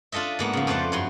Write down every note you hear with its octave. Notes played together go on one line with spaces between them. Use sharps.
D4 F4 A4 D#5 E5
G#2 A#3 B3
C#3 F3
F2 A3 B4 C5 D5 A5
G2 F#3 C6